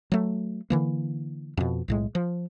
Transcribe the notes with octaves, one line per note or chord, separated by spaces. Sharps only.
F#3 A3
D3 E3 A#3
F2 B2
B1 A2 G#3
F3